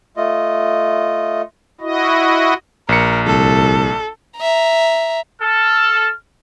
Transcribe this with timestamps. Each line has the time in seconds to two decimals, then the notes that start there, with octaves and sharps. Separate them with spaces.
0.17 A3 F4 D#5
1.81 E4 F#4 D#5
2.89 A#1 A#4 C#7
3.27 C2 A4
4.39 E5 A#5
5.42 A4 F6